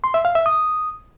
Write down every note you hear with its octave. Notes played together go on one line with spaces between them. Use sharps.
C6
E5
F5
E5
D#6